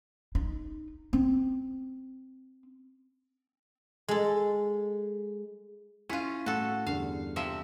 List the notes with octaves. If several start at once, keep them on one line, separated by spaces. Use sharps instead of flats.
D#4
C4
G#3 A4
C#4 E4 F4 B6 D#7
A2 F#4 A4
E2 G2 D3 F5
C3 F3 E5